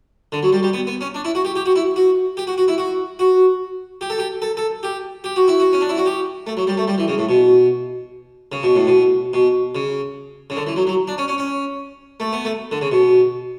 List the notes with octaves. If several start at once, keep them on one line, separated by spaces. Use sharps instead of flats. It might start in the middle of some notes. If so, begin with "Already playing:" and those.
D3
F#3
G3
G3
B3
B3
C#4
D4
E4
F#4
G4
G4
F#4
E4
F#4
G4
F#4
F#4
E4
F#4
F#4
G4
A4
G4
A4
A4
G4
G4
F#4
E4
F#4
C#4
D4
E4
F#4
G4
A3
F#3
G3
A3
G3
E3
C#3
A2
B2
C#3
B2
A2
B2
B2
C#3
C#3
D3
E3
F#3
F#3
D4
C#4
C#4
C#4
A3
B3
A3
D3
C#3
B2